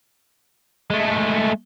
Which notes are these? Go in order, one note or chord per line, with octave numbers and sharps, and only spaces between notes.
G#3 A3